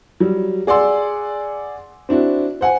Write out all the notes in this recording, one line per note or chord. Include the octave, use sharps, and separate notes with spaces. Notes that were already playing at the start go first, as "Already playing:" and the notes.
F#3 G3
G#4 D5 F#5 C6 E6
C4 D4 E4 F#4
C5 F#5 G#5